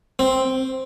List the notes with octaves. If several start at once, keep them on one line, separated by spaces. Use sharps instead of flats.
C4